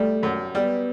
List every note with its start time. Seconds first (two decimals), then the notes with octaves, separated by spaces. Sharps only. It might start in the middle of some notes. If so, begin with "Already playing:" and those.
Already playing: G3 A3
0.23 F#2
0.55 G3 B3